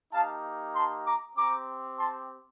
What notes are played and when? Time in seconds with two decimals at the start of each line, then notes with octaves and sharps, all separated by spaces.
0.13 A#3 D#4 G4 F5 A5
0.75 A5 C6
1.06 A#5 D6
1.37 C4 G4 A#5 D6
1.99 A5 C6